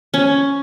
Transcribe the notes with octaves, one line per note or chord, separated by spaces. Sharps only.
C#4